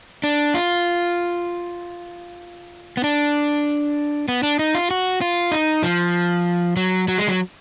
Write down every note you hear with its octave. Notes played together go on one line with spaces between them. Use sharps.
D4
F4
B3
D4
B3
D4
D#4
F4
F#4
F4
D#4
F3
F#3
F#3
G#3
F#3